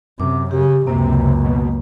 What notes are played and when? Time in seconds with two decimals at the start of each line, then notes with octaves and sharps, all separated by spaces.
0.20 F#2 C3 D6
0.51 C#3 G4
0.87 C#2 F#2 C3 A#3
1.44 B2